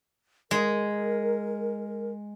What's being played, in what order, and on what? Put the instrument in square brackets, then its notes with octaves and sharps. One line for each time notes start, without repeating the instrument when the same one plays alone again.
[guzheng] G#3 [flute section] A#4